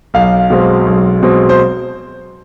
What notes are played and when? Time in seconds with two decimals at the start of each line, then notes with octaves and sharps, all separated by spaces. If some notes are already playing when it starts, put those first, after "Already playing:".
0.14 B1 F5
0.50 B2 G#3 C4
0.86 B1
1.23 B2 G#3 C4
1.49 C5